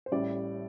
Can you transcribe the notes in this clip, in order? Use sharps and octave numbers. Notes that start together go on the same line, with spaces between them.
C5
A1 A2 G3 D5